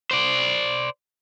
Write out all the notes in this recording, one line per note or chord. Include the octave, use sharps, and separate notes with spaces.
C5 D5